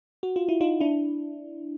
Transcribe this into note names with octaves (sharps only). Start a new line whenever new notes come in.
F#4
F4
E4
D#4 F4
D4 E4